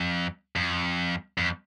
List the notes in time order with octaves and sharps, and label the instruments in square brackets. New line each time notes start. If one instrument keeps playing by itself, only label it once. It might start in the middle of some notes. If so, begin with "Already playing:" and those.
Already playing: [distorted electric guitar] F2
F2
F2